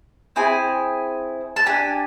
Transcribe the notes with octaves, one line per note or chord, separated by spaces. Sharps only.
C4 E4 G#4 G#5
A5
D4 G4 G#5